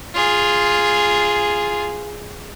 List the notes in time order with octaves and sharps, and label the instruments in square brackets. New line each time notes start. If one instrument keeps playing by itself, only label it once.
[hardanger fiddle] F4 G#4